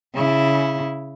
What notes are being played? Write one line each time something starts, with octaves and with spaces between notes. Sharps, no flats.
C#3 E4